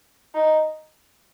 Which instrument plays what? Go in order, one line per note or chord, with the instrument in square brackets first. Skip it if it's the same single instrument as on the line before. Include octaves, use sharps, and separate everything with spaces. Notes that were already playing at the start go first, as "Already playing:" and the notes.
[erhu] D#4